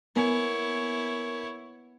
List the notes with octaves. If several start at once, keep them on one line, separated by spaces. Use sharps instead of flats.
B3 E4 A#4 C#5 G#5